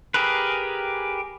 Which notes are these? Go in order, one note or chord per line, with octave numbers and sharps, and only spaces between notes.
G4 G#4 A#4 B4